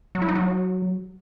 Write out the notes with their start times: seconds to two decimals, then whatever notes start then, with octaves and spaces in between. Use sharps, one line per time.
0.15 F#3
0.22 E4
0.29 D#4
0.35 F#3